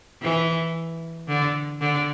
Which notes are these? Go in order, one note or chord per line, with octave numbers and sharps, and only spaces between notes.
E3
D3
D3